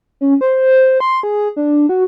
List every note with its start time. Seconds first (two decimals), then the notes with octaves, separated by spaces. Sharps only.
0.21 C#4
0.41 C5
1.00 C6
1.23 G#4
1.56 D4
1.89 F#4